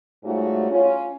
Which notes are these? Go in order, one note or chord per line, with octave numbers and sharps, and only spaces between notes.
G#2 G3 A3 C#4 F4 F#4
C#4 F4